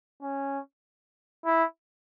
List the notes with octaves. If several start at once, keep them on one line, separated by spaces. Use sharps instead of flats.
C#4
E4